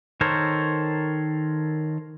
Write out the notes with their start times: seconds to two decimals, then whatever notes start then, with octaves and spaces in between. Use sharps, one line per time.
0.21 D#3 A4 A#4 C5 C#5